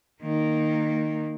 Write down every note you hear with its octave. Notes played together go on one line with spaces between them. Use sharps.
D#3 A#3